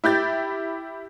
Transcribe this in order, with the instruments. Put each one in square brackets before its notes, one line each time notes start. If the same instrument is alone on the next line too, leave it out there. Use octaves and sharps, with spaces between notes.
[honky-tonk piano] E4 G4 G6 A6